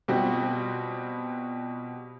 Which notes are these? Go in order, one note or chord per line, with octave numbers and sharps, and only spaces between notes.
B2 G3 C4 F4 F#4